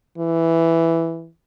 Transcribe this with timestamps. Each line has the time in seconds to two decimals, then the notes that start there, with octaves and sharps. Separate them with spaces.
0.18 E3